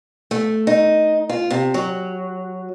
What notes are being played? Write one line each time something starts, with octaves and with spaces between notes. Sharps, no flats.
A3
D#4
F4
C3
F#3